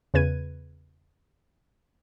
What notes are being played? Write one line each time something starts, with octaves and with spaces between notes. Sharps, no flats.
E2 C#3 B4 G#6 D#7